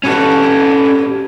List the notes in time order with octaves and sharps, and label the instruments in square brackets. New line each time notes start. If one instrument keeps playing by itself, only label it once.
[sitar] G2 A#2 F#4 [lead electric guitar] C#4 A4